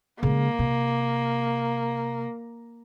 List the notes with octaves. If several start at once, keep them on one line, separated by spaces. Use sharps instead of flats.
C#3 G#3 A#3
C3